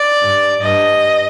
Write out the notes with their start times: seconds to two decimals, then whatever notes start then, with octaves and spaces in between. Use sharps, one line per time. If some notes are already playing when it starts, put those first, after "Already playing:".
Already playing: D5
0.21 G2
0.62 G2 D#5